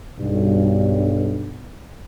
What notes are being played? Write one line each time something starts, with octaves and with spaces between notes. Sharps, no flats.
B1 G2